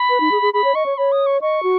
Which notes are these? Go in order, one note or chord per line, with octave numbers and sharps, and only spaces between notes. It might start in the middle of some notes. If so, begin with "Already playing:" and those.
Already playing: B5
B4
D#4
G#4
G#4
G#4 B5
C#5
D#5 C#6
C#5
C#5 B5
D#6
C#6
D#5 C#6
F#4